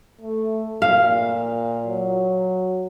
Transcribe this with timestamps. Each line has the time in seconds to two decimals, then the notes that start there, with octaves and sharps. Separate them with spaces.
0.21 A3
0.82 A#2 F5
1.86 F#3